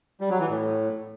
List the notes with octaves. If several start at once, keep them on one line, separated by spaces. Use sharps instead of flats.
G3
F#3
E3
A2